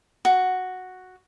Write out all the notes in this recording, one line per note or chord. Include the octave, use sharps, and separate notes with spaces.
F#4